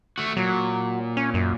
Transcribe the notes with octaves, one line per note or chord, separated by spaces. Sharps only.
A3 F#4
A#2 F#3
C#4
F#2